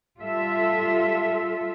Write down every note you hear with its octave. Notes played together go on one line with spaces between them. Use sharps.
G3 F4 A4 E5